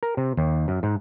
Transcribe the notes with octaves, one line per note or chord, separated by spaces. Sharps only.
A#4
C3
D#2
F#2
G#2